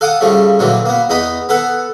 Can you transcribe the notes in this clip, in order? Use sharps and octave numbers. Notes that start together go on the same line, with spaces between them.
A4 F5 F#5 D6 D#6
C#3 F3 G3 A3
A#2 D3 E3 F#3
A#3 B3
E2 B3 D#4 A#5 B5 D#6
B3 A4 B4 F#5